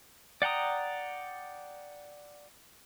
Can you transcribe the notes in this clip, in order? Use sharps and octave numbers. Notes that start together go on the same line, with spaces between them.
D5 F#5 G5 A#5 D#6